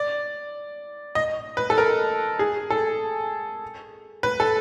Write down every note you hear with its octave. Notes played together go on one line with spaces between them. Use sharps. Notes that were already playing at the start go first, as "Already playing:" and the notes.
Already playing: D5
D#5
B4
A4
A#4
G#4
A4
B4
A4